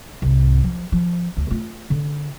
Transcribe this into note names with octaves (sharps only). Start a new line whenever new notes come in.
C2 G#2
F3
F3
D2
A3 F4
D3